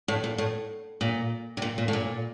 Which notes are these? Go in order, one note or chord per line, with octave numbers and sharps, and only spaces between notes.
A2
A#2
A2
A#2
C3
A#2
A#2
A2
A#2